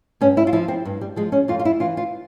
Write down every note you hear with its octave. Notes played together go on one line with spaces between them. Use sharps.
G2 C#4
E4
F4
F3 E4
C4
G2
G3
F3 G#3
C#4
F2 F4
F4
E4
E3 F4
F4